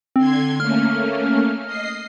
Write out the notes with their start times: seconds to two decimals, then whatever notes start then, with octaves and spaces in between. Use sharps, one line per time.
0.16 D3 C4 C6 G#6
0.60 A3 A#3 C#4 F6
1.65 D#5 C7